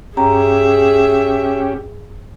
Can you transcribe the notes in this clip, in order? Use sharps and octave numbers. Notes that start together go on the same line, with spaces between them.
G2 C#4 G4 G#4 E5 A#5